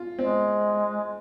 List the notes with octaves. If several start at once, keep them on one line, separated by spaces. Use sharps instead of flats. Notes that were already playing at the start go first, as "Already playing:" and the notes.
Already playing: F4
G#3 C4